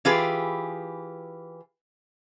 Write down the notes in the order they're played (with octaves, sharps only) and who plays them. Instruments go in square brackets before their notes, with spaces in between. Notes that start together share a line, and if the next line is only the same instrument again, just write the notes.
[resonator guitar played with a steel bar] E3 F4 G4 G#4 B4